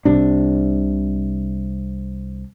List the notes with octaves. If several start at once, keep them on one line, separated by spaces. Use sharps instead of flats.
C2 C3 D4